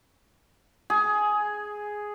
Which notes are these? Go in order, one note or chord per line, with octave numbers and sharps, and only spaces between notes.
G#4